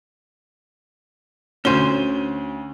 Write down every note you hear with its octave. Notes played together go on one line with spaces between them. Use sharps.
D2 C#4 F#4 C5 D#7 G7